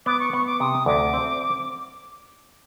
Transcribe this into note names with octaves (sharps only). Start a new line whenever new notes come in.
B3 D6
C#6
B3 C#6
D6
C3 D#6
D2 D6
C4